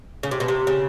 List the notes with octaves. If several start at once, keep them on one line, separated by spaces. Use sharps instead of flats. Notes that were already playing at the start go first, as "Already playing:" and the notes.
C#3
C3
B2
C3
C#3